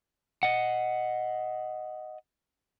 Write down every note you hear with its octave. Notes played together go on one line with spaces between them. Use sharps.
D#5 F#5